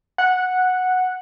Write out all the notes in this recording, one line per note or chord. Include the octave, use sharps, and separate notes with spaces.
F#5